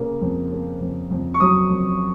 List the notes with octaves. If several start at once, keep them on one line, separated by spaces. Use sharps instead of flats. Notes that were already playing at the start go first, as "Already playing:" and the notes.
Already playing: C#3 A#3
F2
A#3
F2
F2
C#6
F#3 D#6
F2